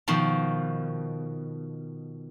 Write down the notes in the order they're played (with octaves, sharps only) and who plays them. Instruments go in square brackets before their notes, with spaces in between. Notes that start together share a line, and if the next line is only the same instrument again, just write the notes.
[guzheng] B2 D#3 F3